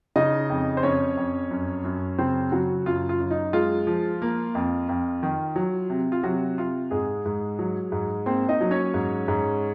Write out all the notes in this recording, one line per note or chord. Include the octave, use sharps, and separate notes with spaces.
C#3 D#4 D#5
F2
C5
F2 C#4 C#5
F2
F#2
F#2
C#3 C4 C5
C#3 F#3 F#4
F#2 F4
F4
F#2
D#4
G#3 F4
F3
A#3
F2
F2
D#3
F#3
C3
F4
C3 F#3 F#4
C3 F4
G#2 G#3 G#4
G#2
F#3
G#2
A#3 C4 C5
D#4 D#5
F#3
C#4 C#5
G#2
G#2